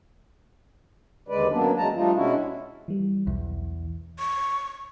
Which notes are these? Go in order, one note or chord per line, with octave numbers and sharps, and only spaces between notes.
D#2 D3 G#3 B4 D5
F#2 F#3 A#3 B3 D4
F#2 E3 F#3 G#3 A5 A#5
F3 G3 A3 D4 D#4 F4
B2 G#3 C#4 D4 E4 F#4
E3 G3
B1 E2
C#6